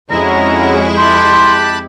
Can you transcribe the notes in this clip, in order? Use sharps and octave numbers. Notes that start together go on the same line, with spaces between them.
F2 G#3 C#4 E4 F#4 A#5
G4 A5 B5 C6 F#6